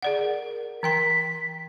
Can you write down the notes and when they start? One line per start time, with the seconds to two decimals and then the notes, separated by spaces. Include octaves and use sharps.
0.02 G#4 D5 F#5
0.20 A#4
0.83 E3 G5 C6 B6